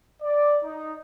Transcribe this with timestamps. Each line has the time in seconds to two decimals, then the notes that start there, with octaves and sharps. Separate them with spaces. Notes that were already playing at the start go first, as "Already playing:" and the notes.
0.22 D5
0.63 D#4